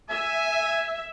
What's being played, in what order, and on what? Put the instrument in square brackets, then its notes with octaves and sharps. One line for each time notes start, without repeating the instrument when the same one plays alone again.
[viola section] E5 [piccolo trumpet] G#5